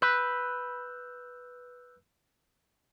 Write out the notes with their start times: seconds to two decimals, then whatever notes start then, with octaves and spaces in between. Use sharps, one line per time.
0.02 B4 E6 F#6 G6